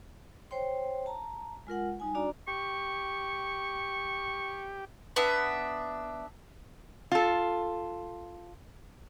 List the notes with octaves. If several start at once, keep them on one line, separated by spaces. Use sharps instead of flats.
C5 C#5 G5 C6
A5 A#5
G#3 F4 A#4 F#5
G3 D#4 G#5
D4 F#4 D5 A#5
G4 C#6
B3 D4 E5
F4 A4